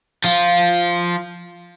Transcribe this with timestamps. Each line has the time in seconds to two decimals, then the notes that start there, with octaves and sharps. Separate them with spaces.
0.24 F3 F4